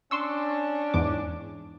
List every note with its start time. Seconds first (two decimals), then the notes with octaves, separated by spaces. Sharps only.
0.11 C#4 D4 C6 C#6 E6
0.94 E2 G#2 D6